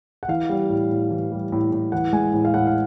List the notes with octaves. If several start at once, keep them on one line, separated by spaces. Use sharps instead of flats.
F#5
E3 F5
G3
A2
A2
E3
G3
A2
A2
E3 F#5
G#3 G#5
A2
F5
A2 F#5
F5